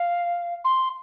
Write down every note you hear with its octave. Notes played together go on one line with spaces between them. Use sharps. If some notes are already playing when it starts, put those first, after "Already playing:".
Already playing: F5
C6